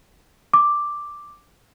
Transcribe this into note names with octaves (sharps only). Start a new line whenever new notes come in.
D6